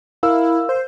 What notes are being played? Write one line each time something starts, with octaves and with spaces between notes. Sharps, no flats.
E4 A#4 F5 E6
C5